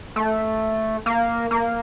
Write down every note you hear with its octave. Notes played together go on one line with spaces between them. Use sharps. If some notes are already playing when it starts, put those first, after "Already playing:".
A3
A#3
A#3